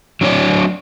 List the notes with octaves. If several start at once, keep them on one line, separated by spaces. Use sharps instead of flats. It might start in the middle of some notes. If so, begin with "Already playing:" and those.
F#3 D4 C#5 D5